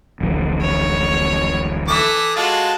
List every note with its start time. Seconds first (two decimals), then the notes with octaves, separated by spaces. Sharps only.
0.21 D1 A1 F3
0.61 C#5
1.88 E3 A4 E5 D6 D#6
2.36 G#3 F4 F#4 A5